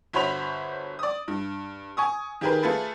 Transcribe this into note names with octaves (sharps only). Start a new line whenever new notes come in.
G1 F#4 C5 C#5 B5 F7
D5 D#6
G2
G#5 C#6 D#6
D#3 G4 G#4 A#4 B4
A3 F4 G#4 A4 B4